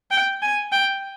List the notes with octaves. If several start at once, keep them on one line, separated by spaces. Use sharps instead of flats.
G5
G#5
G5